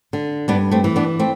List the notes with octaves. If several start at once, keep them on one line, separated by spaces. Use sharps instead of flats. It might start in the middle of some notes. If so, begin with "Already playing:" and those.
D3
G2 B3 D4
A3 C4
E3
B3 D4
A3 C4